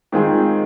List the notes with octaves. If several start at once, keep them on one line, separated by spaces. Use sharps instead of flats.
D#3 G#3 C4 F4 G#4